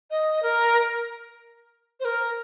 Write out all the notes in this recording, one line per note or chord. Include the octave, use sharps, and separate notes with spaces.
D#5
A#4
C5
A#4